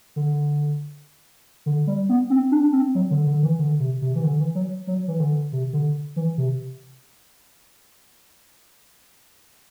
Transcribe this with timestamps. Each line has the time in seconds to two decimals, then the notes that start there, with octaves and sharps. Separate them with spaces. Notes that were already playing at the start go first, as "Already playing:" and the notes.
0.16 D3
1.66 D3
1.87 G3
2.09 B3
2.30 C4
2.52 D4
2.72 C4
2.95 F#3
3.11 D3
3.27 D3
3.43 E3
3.59 D3
3.80 C3
4.02 C3
4.15 E3
4.24 D3
4.39 E3
4.55 F#3
4.87 F#3
5.08 E3
5.20 D3
5.52 C3
5.73 D3
6.16 E3
6.38 C3